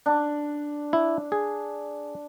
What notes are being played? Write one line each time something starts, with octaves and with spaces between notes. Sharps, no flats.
D4
E4
G#4